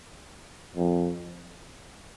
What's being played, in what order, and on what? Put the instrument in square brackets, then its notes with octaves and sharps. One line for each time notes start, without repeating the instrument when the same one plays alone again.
[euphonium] F2